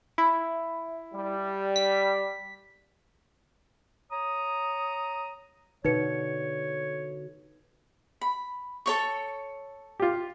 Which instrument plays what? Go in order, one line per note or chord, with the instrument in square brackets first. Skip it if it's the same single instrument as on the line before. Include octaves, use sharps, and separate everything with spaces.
[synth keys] E4
[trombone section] G3
[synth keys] B6
[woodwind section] C#5 A#5 D#6
[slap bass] B2 D3 [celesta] D#4 B4 C#7 [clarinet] C#5
[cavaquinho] B5
A4 C#5 C#6
[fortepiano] F4 G4